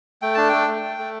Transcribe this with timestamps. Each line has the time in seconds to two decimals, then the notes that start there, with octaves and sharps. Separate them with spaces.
0.22 A3 G5
0.35 D4 A5
0.49 A3 G5
0.67 A3
0.83 A3
0.98 A3